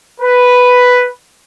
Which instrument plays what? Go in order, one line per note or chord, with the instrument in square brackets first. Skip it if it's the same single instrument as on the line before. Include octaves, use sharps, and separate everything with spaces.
[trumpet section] B4